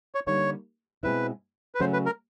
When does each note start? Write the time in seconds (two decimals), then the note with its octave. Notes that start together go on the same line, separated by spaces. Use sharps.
0.15 C#5
0.27 D3 G3 A#3 D#4 C#5
1.03 B2 G#3 C4 E4 B4
1.75 B4
1.80 C#3 F#3 A3 C#4 F#4 C5
1.93 B4
2.06 A#4